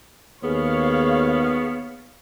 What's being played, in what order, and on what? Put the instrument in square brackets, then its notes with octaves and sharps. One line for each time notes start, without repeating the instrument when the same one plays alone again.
[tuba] D#2 [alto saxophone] B3 [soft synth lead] G#4 [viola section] C#5 F5